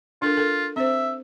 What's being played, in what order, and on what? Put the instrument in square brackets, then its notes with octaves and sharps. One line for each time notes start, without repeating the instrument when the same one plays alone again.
[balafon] D4 A4 A#4 [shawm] F4
[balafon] A4 A#4
[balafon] C4 C5 [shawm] E5